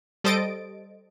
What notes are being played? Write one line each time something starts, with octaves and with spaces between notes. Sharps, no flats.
G3 A4 C5 D#5 A6 D7